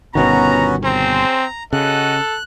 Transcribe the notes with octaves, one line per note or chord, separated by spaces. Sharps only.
G1 B2 D#3 B3 C#4 F#4 A#5
C4 C#4 G#4 C5 A#5
C#3 F#4 A4 D#5 F#5 F#6